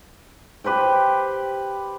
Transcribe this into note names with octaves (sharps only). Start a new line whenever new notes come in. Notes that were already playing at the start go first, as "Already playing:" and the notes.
G4 B4 C5 G5